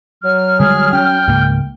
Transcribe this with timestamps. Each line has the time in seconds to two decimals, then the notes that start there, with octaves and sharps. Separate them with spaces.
0.23 F#3 F6
0.60 D3 G3 G#3 G#4
0.93 C#4 G5
1.27 C#2 G#2 A#3